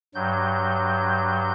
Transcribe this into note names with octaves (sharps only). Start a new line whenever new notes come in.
G2 F#3 G6